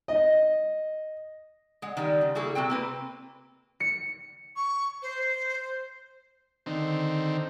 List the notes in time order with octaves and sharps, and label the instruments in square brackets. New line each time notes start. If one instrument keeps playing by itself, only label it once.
[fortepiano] D#5
[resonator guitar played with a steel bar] G#3 F#5
D#3 G3 G#3
C#3
G3 A#3 E4 F#4 G#4 A4
C3 C4 F#4 G5
A#3 C4 B4
[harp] C#7
[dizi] C#6
C5
[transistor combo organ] D3 D#3 C4